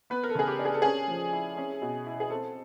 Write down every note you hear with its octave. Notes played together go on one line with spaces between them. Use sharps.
B3 B4
A#4
A4
C#3 G#4
G4
D4
G#4
A4
C#4 G#4
F3
E4
C#4
B2
E4
G#4
C4 A4